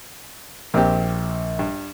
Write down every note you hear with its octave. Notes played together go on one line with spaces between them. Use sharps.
A#1 A#2 C4 G4
G2